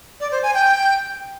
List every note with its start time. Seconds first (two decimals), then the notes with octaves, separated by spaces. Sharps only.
0.20 D5
0.32 C5
0.43 G#5
0.54 G5